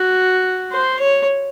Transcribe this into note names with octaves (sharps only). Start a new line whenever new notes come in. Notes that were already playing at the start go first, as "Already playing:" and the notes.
Already playing: F#4
C5
C#5